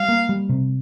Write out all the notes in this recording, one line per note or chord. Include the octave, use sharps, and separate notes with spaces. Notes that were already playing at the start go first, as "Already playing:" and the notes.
Already playing: G3 F5
A#3
G3
C3